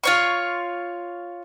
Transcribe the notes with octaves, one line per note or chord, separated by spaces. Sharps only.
F4 C#5 C#6